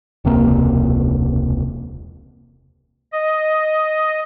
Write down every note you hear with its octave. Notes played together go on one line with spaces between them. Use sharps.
E1 C#2 C3 A#3
D#5